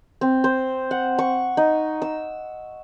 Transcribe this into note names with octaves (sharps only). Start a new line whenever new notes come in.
C4
C5
F#5
C#6
D#4
E6